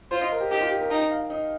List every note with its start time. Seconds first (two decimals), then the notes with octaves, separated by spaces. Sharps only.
0.11 F4 C5
0.21 D#5
0.32 A#4
0.40 G4
0.51 D#4 G4
0.61 F4
0.70 G4
0.81 A#4
0.90 D#4 G5
1.11 F5
1.30 D#4